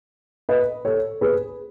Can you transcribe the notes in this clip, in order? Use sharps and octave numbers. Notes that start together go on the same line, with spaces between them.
B4 D#5
A4 C#5
G#4 B4